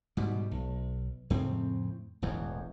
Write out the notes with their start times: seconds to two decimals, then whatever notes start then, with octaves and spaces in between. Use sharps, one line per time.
0.17 G#2 B2 G3
0.51 B1
1.30 F2 A2 C#3 C4
2.22 E1 A1 E2 E3